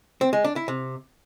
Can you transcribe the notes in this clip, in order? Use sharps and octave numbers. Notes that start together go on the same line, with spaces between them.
C4
G#3
D4
E4
C3